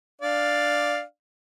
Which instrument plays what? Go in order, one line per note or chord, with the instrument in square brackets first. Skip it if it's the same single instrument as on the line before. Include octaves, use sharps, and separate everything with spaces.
[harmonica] D4 D5 F5